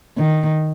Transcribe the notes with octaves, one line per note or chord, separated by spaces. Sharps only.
D#3